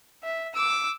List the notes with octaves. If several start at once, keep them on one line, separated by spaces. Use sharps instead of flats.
E5
D6 E6